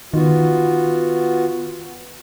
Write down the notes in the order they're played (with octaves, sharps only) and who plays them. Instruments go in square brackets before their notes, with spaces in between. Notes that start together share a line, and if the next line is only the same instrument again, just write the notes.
[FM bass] D#3 [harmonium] B3 F4 F#4